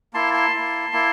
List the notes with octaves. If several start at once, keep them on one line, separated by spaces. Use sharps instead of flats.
A#3 E4 A5 C6
A5 C6
A#3 E4
A#3 E4